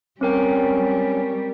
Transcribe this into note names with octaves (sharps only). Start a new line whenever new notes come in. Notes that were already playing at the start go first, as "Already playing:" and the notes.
G3 C4 C#4 A#4 G5